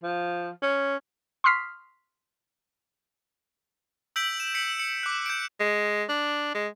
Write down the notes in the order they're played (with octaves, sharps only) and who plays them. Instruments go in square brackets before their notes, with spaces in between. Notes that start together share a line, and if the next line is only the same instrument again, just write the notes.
[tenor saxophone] F3
C#4
[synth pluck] C6 C#6 D#6 F6 B6 C7
[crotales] E6 G6 B6 D7 F#7
E7
B6 C#7 D7
C#7
D6 F#6
G6 D7
[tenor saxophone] G#3
D4
G#3